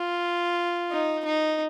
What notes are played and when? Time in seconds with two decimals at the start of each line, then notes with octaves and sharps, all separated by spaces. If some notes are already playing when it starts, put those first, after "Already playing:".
Already playing: F4
0.91 D#4
1.25 D#4